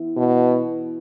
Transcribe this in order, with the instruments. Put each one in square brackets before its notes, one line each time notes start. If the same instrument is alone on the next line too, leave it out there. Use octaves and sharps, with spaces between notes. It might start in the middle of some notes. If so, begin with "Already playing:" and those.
Already playing: [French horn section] E3 B3 E4
[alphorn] B2